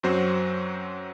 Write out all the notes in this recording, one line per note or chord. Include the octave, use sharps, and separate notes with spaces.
F#2 F#3 C4 F#4 C5